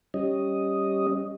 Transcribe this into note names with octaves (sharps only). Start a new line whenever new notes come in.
G3 C#4 D#5